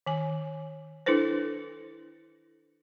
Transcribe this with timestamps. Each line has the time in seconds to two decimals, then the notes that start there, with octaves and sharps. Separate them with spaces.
0.06 D#3 G#5
1.06 D4 E4 A4 B4 C5